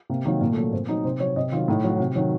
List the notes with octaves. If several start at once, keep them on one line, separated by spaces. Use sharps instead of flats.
C3 A#3
D#3 F#3 A#3
A#2 A#3
A3
F#3
A#3
A#2 C4
F#3 D#4
C3 C5
F#3 C#5
C3 D#5
D#3 F#3 F4
A2 D#4
F#3
F#4
C3
D#3 F#3